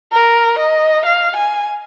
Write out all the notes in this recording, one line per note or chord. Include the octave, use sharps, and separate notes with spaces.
A#4
D#5
F5
G#5